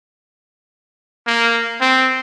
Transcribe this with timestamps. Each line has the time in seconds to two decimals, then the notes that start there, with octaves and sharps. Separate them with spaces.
1.27 A#3
1.81 C4